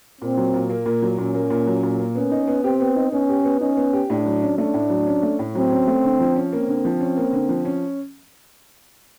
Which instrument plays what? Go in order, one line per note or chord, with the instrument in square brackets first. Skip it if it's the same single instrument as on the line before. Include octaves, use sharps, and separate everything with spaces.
[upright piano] A#2 [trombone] C4
[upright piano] F#3
A#2
A#3
A#2
F#3
[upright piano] A#2 [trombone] C#4
[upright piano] A#3
A#2
F#3
A#2
A#3
[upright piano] B3 [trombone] C#4
[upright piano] D#4
B3
[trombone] C4 [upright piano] G4
[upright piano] B3
D#4
[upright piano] B3 [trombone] C#4
[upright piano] G4
B3
[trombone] C#4 [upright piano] D#4
[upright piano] B3
G4
[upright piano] A2 [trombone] D4
[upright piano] F#3
C#4
[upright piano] A3 [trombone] D4
[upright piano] A2
F#3
C#4
A3
A2
[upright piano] F#3 [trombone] C4
[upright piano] C#4
A3
D3
F3
C#4
[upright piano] A#3 [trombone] C4
[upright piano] D3
F3
C#4
A#3
D3
F3
C#4